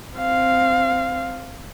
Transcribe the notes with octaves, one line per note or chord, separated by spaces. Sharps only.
C4 F5